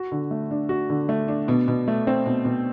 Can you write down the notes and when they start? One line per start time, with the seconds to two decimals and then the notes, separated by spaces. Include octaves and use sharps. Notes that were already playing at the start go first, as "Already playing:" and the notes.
Already playing: F#4
0.12 D3
0.31 A3
0.51 D4
0.69 F#4
0.90 D3
1.09 A3
1.28 D4
1.48 B2
1.68 B2
1.88 A3
2.07 C4
2.26 B2
2.45 B2